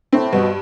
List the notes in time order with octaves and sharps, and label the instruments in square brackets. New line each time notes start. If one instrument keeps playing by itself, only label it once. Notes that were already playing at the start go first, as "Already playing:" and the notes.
[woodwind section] A2 [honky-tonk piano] C4
[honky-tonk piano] G2 [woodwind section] B2